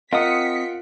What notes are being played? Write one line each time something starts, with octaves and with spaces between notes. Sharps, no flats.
C4 F4 A#4 D#5 F#5 D#6 B6 C#7